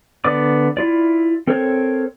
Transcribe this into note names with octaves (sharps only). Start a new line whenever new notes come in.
D3 B3 D5 D6
E4 F4 D5
C4 A4 A#4 C5 C#5